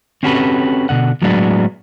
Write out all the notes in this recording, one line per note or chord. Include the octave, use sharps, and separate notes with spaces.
C4 C#4 F#4 G4 A4 B4
B2 D3 F#5
A2 F#3 G#3 B3 D4